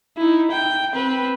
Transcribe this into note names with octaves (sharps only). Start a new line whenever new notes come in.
D#4 E4
G5
C4 B4